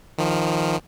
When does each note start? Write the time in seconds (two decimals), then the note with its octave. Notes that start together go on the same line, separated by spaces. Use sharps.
0.18 D#3 F3